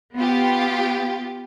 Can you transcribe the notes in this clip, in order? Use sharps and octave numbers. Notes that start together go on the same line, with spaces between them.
B3 F4 G4